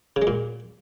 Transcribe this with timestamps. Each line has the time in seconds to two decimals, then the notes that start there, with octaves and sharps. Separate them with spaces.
0.16 C#3
0.22 G#3
0.27 A#2